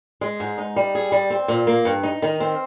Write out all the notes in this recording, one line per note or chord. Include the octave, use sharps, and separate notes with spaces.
G#3
G#2
D#4
G3
G#4
G3
C4
A#2
A#3
G2
D#4
D#3
C4